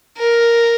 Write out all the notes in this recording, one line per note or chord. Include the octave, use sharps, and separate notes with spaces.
A#4